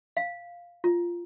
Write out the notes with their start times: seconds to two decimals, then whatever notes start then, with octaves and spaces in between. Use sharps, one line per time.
0.17 F5
0.84 F4